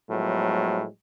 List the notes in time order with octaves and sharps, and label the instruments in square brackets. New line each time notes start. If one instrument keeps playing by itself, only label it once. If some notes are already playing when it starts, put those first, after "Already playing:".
[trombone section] A2 F3 F#3 G#3 A3 B3